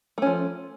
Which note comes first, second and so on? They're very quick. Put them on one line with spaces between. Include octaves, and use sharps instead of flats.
A3 C#4 F3